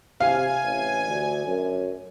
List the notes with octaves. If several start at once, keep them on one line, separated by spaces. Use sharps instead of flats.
C3 F5 G#5
A1
D2
F#2